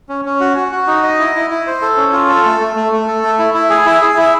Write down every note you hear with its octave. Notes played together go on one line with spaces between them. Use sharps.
C#4
C#4
F#4
F#4
F#4
D#4
D#5
E4
E4
E4
C5
A4
C#4
F4
A4
A3
A3
A3
A3
A4
A3
E4
E4
G#4
E4
G#4
E4